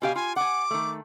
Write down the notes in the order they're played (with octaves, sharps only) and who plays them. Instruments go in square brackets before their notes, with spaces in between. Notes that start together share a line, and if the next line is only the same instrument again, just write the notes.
[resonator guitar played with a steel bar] B2 G4 F5 [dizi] G#5
[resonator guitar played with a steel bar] F4 [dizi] G#5
[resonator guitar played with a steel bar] F#5 G#5 [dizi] D6
[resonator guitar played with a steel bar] D#3 A3